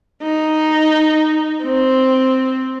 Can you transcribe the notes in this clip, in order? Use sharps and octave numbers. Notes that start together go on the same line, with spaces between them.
D#4
C4